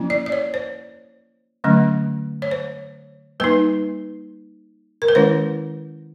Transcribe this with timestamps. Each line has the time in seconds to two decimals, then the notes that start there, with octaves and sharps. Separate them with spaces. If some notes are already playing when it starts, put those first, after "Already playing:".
Already playing: F3 A#3 C#4 E4
0.10 D5
0.26 D5
0.32 C#5
0.54 C5
1.64 D3 F#3 A3 C#4
2.42 C#5
2.51 C5
3.40 G3 A#3 D#4 B4
5.02 A#4
5.08 B4
5.15 D#3 G#3 C#4 E4 C5